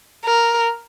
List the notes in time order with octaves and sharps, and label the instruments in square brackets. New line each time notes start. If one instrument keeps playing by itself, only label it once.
[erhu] A#4